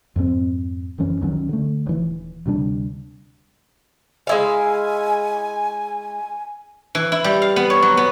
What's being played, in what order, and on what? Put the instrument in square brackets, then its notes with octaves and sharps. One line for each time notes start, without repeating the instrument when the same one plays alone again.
[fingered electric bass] F2 G#2 G3 C4
D#1 F#2 E3 C#4
C#2 D#3 F#3 C#4
D3 A3
D#1 E3
D2 C3 G3 D4
[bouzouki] G#3 E4 F5 [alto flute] G#5
[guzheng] E3
E4
G3
F5
B3
C#5
F#3
B3